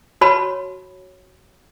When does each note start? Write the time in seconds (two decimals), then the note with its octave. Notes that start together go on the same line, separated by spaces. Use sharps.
0.21 F#4 C#5 A5 B5